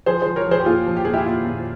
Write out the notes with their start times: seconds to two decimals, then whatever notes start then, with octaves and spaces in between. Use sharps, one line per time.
0.06 F3 G#4 C5
0.21 F3 G#4 C5
0.36 A#4 C#5
0.46 F3
0.51 G#4 C5
0.60 G4
0.66 A#2 F4 G#4
0.86 F3
0.97 G4
1.05 A#2 G#4
1.14 E4 G4
1.26 A#2 F4
1.45 A#2